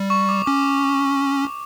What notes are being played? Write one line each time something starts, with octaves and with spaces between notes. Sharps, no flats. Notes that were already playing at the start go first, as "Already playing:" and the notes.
Already playing: G3
C#6
D6
C#4 D6